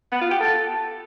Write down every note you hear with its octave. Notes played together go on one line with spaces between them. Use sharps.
B3
F4
G4
A4